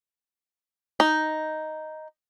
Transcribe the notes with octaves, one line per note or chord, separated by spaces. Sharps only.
D#4